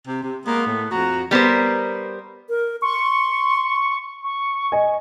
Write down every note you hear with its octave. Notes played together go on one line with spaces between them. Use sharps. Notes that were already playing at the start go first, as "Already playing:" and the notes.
C3
C3
G#3 A#3 B3
A2
F2 F#4 A#5
G3 B3 A#4 C5
A#4
C6 C#6
C#6
D#5 G#5